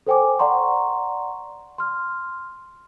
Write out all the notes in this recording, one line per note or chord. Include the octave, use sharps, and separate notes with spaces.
A4 C5 G5 G#5 D6
D5 F#5 A#5 C6 C#6
C6 F6